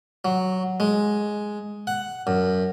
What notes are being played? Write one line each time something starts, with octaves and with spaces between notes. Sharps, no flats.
F#3
G#3
F#5
F#2